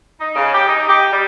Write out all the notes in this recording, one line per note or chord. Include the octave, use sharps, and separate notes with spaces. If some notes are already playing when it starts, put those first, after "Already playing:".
D#4
C#3
G4
D#4
G4
G3